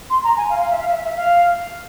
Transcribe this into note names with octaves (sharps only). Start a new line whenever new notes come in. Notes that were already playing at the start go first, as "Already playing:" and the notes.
C6
A#5
G#5
F5
F5
E5
F5
E5
E5
F5